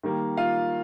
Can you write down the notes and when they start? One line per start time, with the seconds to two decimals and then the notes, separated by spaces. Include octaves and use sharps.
0.03 D#3 G3 A#3
0.37 F4 F5